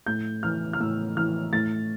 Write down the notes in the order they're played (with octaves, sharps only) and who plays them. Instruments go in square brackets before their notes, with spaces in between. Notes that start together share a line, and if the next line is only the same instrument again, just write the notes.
[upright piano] A2 G6
E3 F6
F6
A2 E6
E3 F6
A2 A6